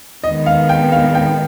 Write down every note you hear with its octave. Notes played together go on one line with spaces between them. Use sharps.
D#3 G#3 B3 D#5
F5
G5
F5
G5